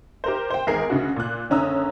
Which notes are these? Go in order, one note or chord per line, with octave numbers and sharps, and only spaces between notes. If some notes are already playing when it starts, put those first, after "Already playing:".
G4 A#4 C5
C5 G5
G#1 E2 G#4 A#4 C7
D2 C#3 F#4
A#2 F#6
F#1 D3 C#4 A#5 D#6 E6